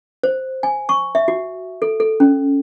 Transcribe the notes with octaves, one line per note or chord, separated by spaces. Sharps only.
C5
G#5
C#6
E5
F#4
A4
A4
C#4